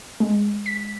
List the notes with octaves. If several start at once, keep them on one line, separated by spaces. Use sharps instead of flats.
G#3
B6